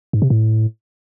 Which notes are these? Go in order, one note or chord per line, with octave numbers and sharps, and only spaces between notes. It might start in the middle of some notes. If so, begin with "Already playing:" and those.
G#2
C3
A2